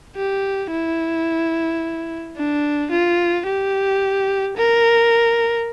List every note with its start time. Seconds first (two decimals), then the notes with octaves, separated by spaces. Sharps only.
0.16 G4
0.71 E4
2.37 D4
2.91 F4
3.47 G4
4.57 A#4